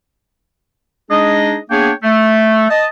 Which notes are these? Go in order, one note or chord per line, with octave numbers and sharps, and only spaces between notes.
G#3 D4 D#4 G#4 D#5
A#3 B3 D4 G#4 C#5 G5
A3
D#5 A5